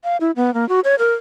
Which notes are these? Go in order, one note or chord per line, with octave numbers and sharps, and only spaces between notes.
F5
E4
B3
A#3
F#4
C#5
A#4